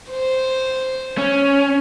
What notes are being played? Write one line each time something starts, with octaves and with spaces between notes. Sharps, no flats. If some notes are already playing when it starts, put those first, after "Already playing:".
C5
C#4